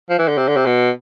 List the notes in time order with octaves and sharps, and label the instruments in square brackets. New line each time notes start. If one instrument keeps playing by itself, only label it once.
[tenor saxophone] F3
E3
D3
C3
D3
C3
B2